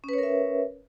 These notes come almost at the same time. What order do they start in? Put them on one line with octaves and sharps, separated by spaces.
C#4 B4 C#5 A#4 E5